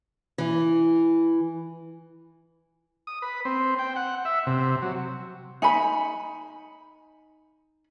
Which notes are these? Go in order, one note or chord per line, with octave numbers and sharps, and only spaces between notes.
E3
D#6
B4
C4
G5
F#5
E5
C3
F#3
D#4 G#5 B5